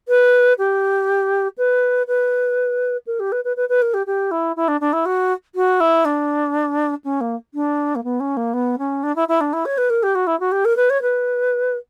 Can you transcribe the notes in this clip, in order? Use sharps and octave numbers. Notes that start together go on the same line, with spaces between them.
B4
G4
B4
B4
A#4
G4
B4
B4
B4
B4
A#4
G4
G4
E4
E4
D4
D4
E4
F#4
F#4
E4
D4
C#4
A#3
D4
A#3
B3
C#4
A#3
B3
C#4
D4
E4
E4
D4
E4
C#5
B4
A#4
G4
F#4
E4
F#4
G4
A#4
B4
C#5
B4